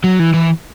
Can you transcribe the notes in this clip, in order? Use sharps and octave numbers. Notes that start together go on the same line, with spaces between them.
F#3
E3
E3